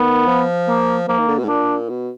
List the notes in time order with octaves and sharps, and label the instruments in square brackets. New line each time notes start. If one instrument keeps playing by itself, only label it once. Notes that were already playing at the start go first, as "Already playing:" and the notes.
Already playing: [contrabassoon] D#3 [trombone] B3
[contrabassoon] F3
[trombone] A#3
[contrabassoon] F3 [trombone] A#3
[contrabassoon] D#3
D3
B2
G#2
[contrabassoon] A#2 [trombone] D4
[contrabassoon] B2